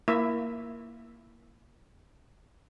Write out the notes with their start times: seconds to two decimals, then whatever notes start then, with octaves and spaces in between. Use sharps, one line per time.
0.08 A#3 E4 E5